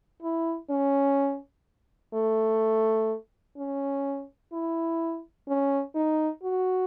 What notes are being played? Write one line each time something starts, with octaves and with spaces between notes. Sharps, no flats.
E4
C#4
A3
C#4
E4
C#4
D#4
F#4